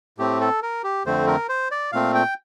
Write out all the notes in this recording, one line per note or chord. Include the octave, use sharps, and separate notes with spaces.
A2 A3 C4 G4
A4
A#4
G4
F2 D3 A3 C4 C5
A#4
C5
D5
A#2 A3 C4 F5
G5